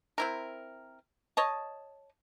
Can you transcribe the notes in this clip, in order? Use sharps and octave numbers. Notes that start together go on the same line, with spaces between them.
C4 E4 A#4
C#5 D#5 A5